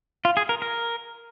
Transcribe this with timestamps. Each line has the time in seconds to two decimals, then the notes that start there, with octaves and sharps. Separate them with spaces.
0.25 F4
0.37 G#4
0.49 A#4
0.62 A#4